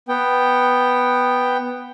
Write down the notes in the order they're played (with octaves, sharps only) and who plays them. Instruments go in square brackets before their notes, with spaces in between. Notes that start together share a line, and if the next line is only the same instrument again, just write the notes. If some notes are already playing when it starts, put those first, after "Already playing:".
[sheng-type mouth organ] B3 G5